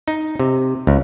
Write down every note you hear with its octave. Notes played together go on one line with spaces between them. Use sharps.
D#4
C3
C#2